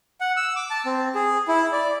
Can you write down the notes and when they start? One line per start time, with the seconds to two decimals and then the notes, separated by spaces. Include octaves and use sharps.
0.21 F#5
0.37 E6
0.56 D6
0.70 A5
0.86 C4
1.15 G#4
1.48 E4
1.72 D5